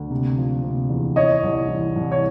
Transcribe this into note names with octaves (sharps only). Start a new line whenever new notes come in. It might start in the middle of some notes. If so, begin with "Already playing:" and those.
Already playing: D2
C3
F3
C3
E2
E3 C#5 D#5
C2
E3
C2
C#5